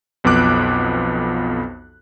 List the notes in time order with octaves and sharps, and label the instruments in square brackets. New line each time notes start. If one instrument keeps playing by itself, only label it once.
[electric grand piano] B1 F2 B3 F4 D6 F#6